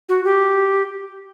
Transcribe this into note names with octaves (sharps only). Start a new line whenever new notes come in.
F#4
G4